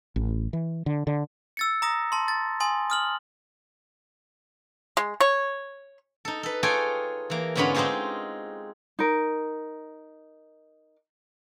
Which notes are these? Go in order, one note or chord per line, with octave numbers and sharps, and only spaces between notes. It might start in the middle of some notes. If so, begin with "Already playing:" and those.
A1
E3
D3
D3
E6 A6 C#7
A#5 D#6 A#6
A5 C6
A6
G#5 C6 D#6
D#6 F6 F#7
G#3
C#5
D#4 A4
A4 B4
F4 G#4 A4 C#5 G5 G#5
E3 A#3
G#2 D3 B3 C#4 F4 B5
G#3 C4 D#4 F4 G4 G#4
D#4 A#4